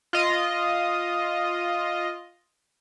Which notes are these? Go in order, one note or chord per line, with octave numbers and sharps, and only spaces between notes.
F4 D#5